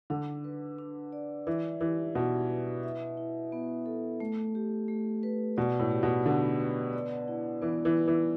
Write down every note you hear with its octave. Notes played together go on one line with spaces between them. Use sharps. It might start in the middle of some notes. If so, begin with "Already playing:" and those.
D3 D4
B4
D4
D5
E3 E5
E3 G4
B2 E4
B4
E5
E4
B3
A4
A3
G4
A3
B4
B2 D5
A2
G4
B2
D3 B3
B4
D5
E4
E3 B3
E3
B4
E3